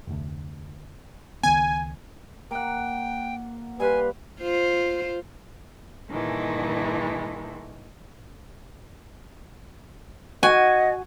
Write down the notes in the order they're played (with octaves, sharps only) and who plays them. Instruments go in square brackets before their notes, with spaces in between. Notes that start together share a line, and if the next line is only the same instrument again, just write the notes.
[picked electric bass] F1 D2
[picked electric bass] C#2 D#3 B3 [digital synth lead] G#5
[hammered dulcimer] A#3 F#5 [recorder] G5
[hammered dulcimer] G3 F5 C6 [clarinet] B4 [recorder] G#5
[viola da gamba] F4 C5
[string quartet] G2 A#2 D#3 E3 G#3 A3
[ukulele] F#4 [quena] D#5 [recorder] F#5 [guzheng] G#5